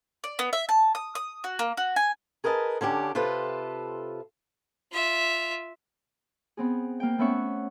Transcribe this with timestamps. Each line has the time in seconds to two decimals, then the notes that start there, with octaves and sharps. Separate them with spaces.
0.24 D5
0.39 B3
0.53 E5
0.69 A5
0.95 D#6
1.15 D#6
1.44 F#4
1.59 A#3
1.77 F#4
1.96 G#5
2.44 G#4 A#4 B4 D#5 A5
2.81 D3 C#4 D4 G4
3.15 C3 F4 A4 B4
4.92 F4 E5
6.57 B3 C4 G#4
7.00 A#3 G5
7.18 A3 B3 C#4 E5 F#5 C#6